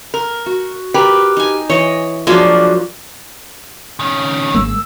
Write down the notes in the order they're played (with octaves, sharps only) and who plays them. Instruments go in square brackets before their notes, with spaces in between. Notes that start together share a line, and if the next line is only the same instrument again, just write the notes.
[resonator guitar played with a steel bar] A#4
[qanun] F#4
[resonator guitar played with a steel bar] G4 A#4 B4
[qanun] D#4 G#5
[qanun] E3 D#5 [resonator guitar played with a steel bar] C#5
[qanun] F3 F#3 F4 [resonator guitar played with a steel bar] G#3 A#3 D4
[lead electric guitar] D#3 C#4
[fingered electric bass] G#1 G#3 A#3 [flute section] E6